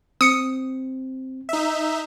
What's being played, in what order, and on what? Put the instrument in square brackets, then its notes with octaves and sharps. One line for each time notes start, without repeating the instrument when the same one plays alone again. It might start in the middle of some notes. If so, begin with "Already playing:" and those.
[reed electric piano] C4 [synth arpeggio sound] D#6 C#7
[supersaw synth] D#4 E5